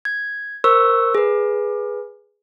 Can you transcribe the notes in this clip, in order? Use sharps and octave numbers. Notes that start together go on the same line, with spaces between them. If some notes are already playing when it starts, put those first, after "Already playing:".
G#6
A#4 C5 C#6 E6
G#4 B4